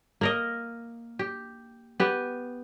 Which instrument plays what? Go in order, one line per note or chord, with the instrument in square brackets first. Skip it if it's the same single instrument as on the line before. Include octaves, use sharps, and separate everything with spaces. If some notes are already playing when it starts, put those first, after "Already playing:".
[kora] A#3 A#4 D#5
G4
B3 G4